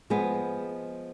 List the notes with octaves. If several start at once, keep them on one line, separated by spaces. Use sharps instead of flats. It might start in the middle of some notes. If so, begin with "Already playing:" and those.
F3 G#3 B3